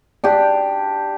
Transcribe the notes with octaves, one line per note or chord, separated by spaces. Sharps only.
D4 G4